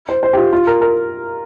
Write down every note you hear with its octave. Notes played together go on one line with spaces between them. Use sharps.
C5
C5
G4
F4
F4
A#4
A#4